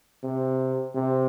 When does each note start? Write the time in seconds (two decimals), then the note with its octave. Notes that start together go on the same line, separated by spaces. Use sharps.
0.24 C3
0.95 C3